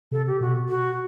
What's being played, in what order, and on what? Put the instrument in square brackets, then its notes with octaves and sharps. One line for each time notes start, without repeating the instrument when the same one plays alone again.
[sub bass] C3 [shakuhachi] A4
[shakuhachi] G4
[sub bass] B2 [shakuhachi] F#4
[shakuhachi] F#4